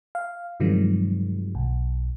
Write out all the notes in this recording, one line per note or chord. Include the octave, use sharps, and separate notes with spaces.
F5
G2 C3 D#3 F3 F#3 G#3
B1